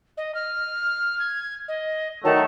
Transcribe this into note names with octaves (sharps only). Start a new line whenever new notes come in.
D#5
F6
G#6
D#5
D#3 F#3 A3 A5